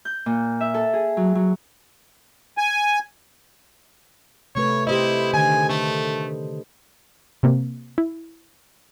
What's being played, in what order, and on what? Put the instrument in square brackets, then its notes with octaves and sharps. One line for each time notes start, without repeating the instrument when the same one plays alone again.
[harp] G6
A#2
E5
A4
G#4
F#3
F#3
[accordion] G#5
[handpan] C3 A3 B4 [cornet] C#5
[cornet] E4 [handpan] G4 C5 D#5
[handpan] D3 D#3 [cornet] G#5
[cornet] A3 [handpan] D4
[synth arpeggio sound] C3 A#3
E4